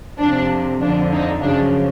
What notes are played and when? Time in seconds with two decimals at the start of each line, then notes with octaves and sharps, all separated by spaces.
0.19 F2 C3 F3 D4
0.82 F2 D3 F3 D4
1.13 D#4
1.43 F#2 C#3 F3 D4